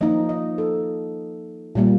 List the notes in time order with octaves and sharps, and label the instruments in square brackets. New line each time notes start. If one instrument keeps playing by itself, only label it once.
[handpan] F3 A#3 D#4 D#5
D#5
A4
A#2 G3 A#3